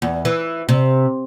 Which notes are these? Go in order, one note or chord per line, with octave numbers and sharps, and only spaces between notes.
E2
E3
C3